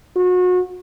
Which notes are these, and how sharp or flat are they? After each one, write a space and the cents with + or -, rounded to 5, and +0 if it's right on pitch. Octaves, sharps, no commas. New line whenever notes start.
F#4 -30